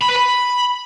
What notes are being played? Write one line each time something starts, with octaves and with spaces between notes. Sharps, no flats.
B5
B4
B5